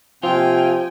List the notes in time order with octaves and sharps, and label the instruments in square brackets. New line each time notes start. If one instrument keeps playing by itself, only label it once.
[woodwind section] C3 A#3 C4 [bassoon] F3 [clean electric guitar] F4 [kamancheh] G5 G#5